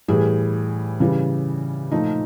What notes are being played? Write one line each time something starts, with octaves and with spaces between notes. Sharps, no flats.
A2 E3 G3 G#4
C#3 E3 G3
A#2 F3 A3 D#4